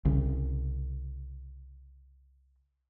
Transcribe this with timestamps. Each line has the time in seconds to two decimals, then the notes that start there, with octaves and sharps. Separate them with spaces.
0.05 C2 C#3